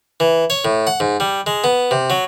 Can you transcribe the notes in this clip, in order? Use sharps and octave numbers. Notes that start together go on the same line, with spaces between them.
E3
C#5
A2
F#5
G#2
G3
G#3
B3
C3
F#3